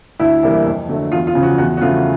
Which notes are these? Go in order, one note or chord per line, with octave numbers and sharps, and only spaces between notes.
D2 E4
C3 E3 G3 A#3
F2
D3 F#3 A3
E2 F4
F4
C#3 F3
F#4
E2 F#4
F#4
C#3 F3 A3 F4